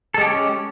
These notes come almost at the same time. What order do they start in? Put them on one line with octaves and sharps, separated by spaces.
A4 G#3 G4 C#4